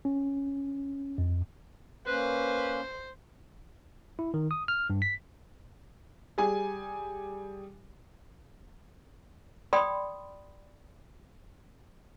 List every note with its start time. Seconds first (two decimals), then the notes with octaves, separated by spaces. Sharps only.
0.05 C#4
1.18 F2
2.07 A#3 C#4 B4 C5
4.19 E4
4.34 D#3
4.51 D#6
4.68 F6
4.90 G2
5.02 B6
6.38 G3 G#4 G#5
9.73 D5 G5 B5 C6 D#6